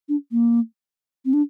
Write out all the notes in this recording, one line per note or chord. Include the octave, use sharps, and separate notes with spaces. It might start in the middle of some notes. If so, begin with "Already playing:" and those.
D4
A#3
C4
D4